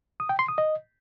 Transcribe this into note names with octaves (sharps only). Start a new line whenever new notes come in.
D#6
G5
C6
D#6
D#5